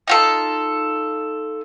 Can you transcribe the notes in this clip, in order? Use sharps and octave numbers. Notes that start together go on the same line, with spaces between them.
D#4 F4 A4